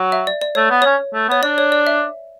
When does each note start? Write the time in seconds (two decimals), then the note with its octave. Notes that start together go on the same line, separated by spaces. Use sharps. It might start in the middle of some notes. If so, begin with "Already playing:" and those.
Already playing: F#3
0.12 E5
0.27 D5
0.41 D5
0.55 A3 C#5
0.70 B3
0.82 C#4 C#5
1.13 A3
1.29 B3 C#5
1.43 D4 D5
1.58 C#5
1.72 D5
1.87 E5